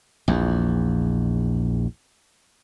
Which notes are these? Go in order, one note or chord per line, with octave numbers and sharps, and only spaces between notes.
A#1 E2